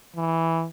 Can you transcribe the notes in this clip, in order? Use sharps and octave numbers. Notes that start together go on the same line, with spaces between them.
E3